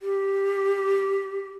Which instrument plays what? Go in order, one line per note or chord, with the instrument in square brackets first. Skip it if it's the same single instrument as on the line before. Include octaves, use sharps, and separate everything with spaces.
[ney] G4